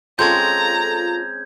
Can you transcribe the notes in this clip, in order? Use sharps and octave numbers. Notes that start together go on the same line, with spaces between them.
G#3 C4 C#4 F4 A4 A#5 G6 G#6